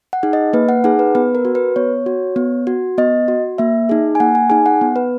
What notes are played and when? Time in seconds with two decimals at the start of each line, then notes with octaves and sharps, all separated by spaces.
0.13 F#5
0.23 D#4 G#4
0.33 D#5
0.53 A#3 B4
0.69 F#5
0.84 D#4 G#4 F#5
0.99 B4
1.15 B3 B4
1.35 A#4
1.45 F#4
1.55 B4
1.76 B3 C#5
2.06 F#4
2.36 B3
2.67 F#4
2.98 B3 D#5
3.28 F#4
3.58 A#3 E5
3.89 D#4 G#4
4.15 G#5
4.20 A#3 F#5
4.35 G#5
4.50 D#4 G#4 G#5
4.66 F#5
4.81 B3
4.96 B4